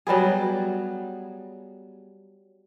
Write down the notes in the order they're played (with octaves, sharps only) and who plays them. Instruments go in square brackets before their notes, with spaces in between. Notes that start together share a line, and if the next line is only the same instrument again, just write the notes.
[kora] F#3 G3 B3 G#4